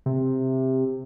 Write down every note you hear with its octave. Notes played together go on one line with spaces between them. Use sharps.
C3